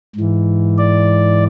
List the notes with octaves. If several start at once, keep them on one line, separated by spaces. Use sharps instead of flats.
G#2 E3
D5